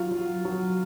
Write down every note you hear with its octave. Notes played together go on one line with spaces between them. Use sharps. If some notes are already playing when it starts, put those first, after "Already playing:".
Already playing: F#3 F4
F#3
F#3